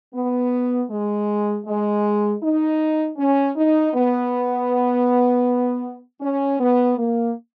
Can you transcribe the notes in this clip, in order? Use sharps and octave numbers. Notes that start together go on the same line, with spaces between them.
B3
G#3
G#3
D#4
C#4
D#4
B3
C#4
B3
A#3